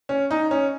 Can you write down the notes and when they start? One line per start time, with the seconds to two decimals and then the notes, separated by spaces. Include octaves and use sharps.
0.09 C#4
0.31 D#4
0.51 C#4